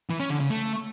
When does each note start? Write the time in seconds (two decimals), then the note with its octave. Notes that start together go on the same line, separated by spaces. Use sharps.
0.10 E3
0.20 C#4
0.30 D3
0.40 C#3
0.50 A3